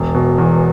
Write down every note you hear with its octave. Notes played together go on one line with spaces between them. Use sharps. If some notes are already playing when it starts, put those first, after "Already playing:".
Already playing: E1
B2
E2